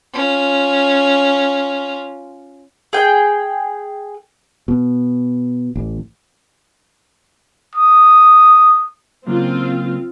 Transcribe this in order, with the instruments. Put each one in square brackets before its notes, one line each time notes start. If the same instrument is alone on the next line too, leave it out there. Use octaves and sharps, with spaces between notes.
[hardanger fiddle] C#4 F4
[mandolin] G#4 G5
[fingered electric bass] B2
A1
[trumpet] D#6
[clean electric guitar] C#3 F#3 A#3 [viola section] C4 F4